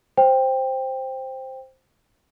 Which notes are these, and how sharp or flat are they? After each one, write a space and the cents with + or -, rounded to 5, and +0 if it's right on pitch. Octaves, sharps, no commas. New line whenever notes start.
C5 +5 G5 +10